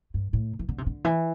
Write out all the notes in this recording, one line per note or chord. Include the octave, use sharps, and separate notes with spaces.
G2
A2
E3
D3
C3
D3
E3